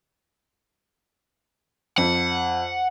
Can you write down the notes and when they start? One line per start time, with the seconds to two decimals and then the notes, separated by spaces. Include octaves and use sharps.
1.98 F2 F#5